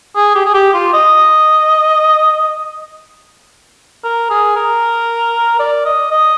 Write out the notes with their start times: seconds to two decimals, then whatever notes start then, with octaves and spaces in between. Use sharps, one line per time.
0.16 G#4
0.35 G4
0.45 G#4
0.54 G4
0.74 F4
0.93 D#5
4.04 A#4
4.30 G#4
4.56 A#4
5.59 D5
5.85 D#5
6.11 D#5